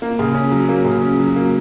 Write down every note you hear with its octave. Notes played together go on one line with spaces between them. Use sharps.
A#3
C#3
C#4
F#3
A#3
C#3
C#4
F#3
A#3